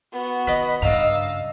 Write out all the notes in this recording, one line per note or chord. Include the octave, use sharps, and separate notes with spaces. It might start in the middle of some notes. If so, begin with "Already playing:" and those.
B3 F#4
D#3 B4 D#5
G2 C#3 D4 D#5 F5 A#5 E6